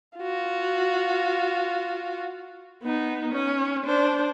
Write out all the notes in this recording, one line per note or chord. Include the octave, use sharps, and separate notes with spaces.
F4 F#4
B3 D#4
C#4
D4 C5